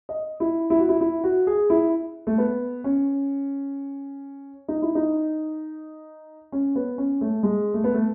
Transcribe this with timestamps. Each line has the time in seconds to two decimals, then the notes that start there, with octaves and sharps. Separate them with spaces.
0.09 D#5
0.40 E4
0.70 E4
0.79 F#4
0.89 E4
1.01 E4
1.24 F#4
1.47 G#4
1.70 E4
2.27 A3
2.38 B3
2.84 C#4
4.68 D#4
4.82 E4
4.95 D#4
6.52 C#4
6.75 B3
6.98 C#4
7.21 A3
7.43 G#3
7.74 A3
7.84 B3
7.94 A3